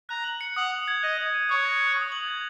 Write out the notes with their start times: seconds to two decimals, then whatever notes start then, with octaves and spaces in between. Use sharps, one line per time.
0.09 A#5 F#6
0.24 F#7
0.41 C#7
0.56 F#5 D#6
0.72 F#7
0.88 G#6
1.03 D#5 F#6
1.18 F#7
1.34 D#7
1.49 C#5 D#6
1.65 A#6
1.80 F#6
1.97 D#6
2.12 F#7
2.28 G#6